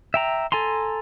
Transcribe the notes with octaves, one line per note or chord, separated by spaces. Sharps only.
E5 G5 A#5
A4 G#5 A#5 C6